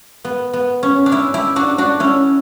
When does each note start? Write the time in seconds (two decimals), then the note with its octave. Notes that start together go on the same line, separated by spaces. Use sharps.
0.25 B3
0.53 B3
0.83 C#4
1.06 D4
1.11 C#4 E4
1.34 E4 G4
1.56 D4 F#4
1.78 D4 F#4
2.00 C#4 E4